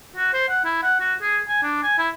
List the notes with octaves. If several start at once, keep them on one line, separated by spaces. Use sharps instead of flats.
F#4
C5
F#5
E4
F#5
F#4
G#4
G#5
D4
G#5
E4